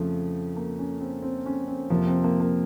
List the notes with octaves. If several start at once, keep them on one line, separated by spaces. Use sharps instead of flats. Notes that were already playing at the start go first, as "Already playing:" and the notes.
Already playing: F2 C#3 F3 A3
A#3
C#4
C4
C4
C#4
C4
F2 C3 F3 A#3
C4
A#3
A#3